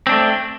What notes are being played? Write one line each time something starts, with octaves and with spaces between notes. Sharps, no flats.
A3 C4 D4